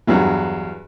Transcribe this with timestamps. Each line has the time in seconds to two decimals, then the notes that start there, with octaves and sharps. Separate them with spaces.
0.07 E2 G2 F#3